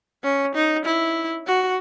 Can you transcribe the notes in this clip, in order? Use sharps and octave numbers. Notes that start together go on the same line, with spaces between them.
C#4
D#4
E4
F#4